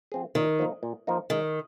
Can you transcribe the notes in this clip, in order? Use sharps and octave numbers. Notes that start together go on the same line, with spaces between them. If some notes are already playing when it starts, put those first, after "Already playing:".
F3 C4 G#4
A#2 D#3
F3 A#3 D#4
A#2
F3 A#3 D#4
D#3 G#3